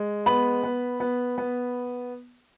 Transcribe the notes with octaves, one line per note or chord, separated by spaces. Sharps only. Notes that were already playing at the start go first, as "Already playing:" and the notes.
Already playing: G#3
B3 B5
B3
B3
B3